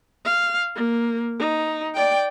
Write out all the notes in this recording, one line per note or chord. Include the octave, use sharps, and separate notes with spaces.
F5
A#3
D#4
D5 G5